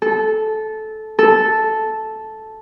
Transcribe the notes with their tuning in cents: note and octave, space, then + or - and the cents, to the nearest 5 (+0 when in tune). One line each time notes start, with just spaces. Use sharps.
A4 -15
A4 -5